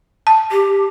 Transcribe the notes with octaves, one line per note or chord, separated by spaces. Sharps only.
A5
G4